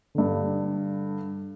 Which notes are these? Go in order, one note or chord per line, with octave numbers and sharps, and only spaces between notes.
G2 D3